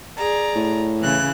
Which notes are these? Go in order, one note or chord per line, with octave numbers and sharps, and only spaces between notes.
G#4 D5 A#5
A2
C#3 E3 F#6